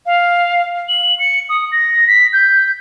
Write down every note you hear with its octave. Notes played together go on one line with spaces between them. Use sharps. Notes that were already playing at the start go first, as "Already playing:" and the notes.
F5
F#7
C#7
D#6
A#6
B6
G6